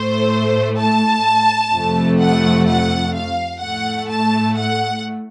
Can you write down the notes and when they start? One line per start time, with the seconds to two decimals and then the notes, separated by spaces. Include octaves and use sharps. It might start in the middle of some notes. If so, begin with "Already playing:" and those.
Already playing: A2 A3 C5
0.79 A5
1.73 F2 C3 F3 A3
2.20 F#5
2.67 F#5
3.15 F5
3.61 A2 A3 F#5
4.09 A5
4.57 F#5